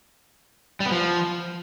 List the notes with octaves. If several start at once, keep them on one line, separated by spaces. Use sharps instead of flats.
G3
B3
F3